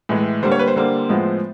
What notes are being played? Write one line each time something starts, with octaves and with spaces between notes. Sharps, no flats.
A2 E3 G#3
D3 G3 A#3 C5
C#5
B4
C5
D3 G3 A#3
A2 F3 G#3 B3